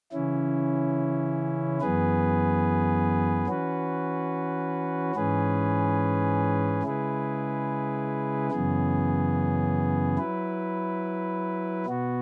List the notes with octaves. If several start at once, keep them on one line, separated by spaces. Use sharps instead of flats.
C#3 E3 C#4 E4
F#2 E3 B3 G#4 B4
E3 C#4 F#4 B4
G#2 E3 C#4 G#4 B4
C#3 G#3 E4 G#4 B4
F#2 C#3 E3 B3 G#4
F#3 E4 B4
B2 B3 F#4